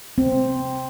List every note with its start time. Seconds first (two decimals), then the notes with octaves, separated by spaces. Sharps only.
0.18 C4